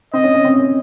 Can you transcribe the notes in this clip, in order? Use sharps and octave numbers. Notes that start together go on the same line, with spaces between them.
C4 D#5
C#4
C#4
C4
C#4